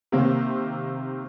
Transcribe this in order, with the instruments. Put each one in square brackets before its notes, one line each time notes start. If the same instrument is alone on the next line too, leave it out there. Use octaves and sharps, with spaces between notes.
[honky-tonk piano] C3 D#3 A#3 C4